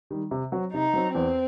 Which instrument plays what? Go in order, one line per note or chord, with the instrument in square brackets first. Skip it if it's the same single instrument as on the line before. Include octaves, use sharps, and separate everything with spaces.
[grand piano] D#3 G3
C3
F#3 C4 F#4
[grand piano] C3 [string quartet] D#4
[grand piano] F#3 C4 F#4
[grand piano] E2 [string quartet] C4